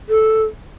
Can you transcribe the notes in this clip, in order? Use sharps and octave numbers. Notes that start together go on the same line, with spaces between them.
A4